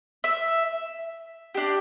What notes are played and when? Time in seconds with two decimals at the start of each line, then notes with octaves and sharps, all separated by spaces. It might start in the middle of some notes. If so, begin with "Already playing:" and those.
0.24 E5
1.55 D4 G4